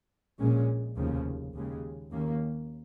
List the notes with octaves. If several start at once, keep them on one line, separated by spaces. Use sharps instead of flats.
A#1 A#2 G#3 C#4
F1 D#2 C#3 F3
D#2 C#3 G#3
D#2 D#3 A#3 C#4